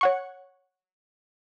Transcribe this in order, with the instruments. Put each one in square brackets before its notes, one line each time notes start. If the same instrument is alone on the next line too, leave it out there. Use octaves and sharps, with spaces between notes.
[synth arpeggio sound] C#5 F#5 C#6